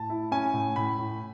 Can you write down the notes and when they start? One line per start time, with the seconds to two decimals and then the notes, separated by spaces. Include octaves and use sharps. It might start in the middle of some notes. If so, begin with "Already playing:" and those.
Already playing: A2 A5
0.10 E4
0.31 C#4 G#5
0.53 A2
0.76 A2 B5
0.98 A2